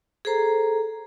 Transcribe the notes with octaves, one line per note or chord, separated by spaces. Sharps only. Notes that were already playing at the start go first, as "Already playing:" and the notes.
G#4 A4 C5 A#5